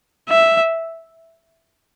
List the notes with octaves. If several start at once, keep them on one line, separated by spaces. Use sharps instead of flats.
E5